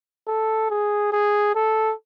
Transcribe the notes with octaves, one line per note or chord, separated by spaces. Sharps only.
A4
G#4
G#4
A4